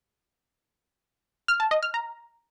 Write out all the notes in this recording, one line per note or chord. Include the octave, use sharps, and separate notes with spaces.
F6
A5
D#5
F6
A#5